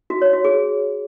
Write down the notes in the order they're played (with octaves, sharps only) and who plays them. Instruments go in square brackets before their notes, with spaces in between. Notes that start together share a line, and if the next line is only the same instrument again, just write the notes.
[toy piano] F#4
C#5
F#4
G#4